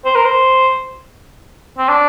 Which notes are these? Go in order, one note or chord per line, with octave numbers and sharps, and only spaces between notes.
C5
A#4
C5
C4
D4